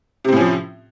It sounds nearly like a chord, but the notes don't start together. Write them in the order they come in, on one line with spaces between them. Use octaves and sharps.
C3 C4 A2 C#4 F3